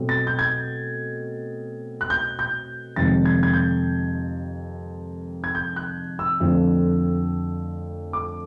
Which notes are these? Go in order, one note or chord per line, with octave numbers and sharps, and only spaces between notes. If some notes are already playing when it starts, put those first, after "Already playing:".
Already playing: B2 F#3 A3 C4
A6
G6
G#6
F#6
G6
G6
F2 C3 D#3 G#3 A6
G#6
G#6
G6
G#6
G6
F#6
E6
F2 D3 F3 A3 C4
D6